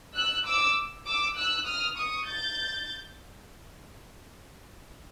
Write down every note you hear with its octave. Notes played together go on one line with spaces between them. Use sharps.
E6 F#6
D6 E6
D6 E6
E6 F#6
D#6 F6
C#6 D#6
G6 A6